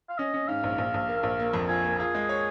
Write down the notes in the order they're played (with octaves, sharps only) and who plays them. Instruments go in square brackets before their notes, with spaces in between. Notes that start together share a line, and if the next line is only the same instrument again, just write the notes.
[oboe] F5
[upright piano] C#4 [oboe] D#5
[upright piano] C#4
[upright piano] G#2 [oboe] F5
[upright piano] A#1
A#1
A#1
A#3
A#1
A#3
F2
[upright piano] F4 [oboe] G#5
[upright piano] A#3
[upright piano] F4 [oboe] G#4
[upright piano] G#3
C#5